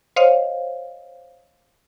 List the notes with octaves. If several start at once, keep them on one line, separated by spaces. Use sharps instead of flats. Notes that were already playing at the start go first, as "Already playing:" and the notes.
C5 C#5 D#5 F5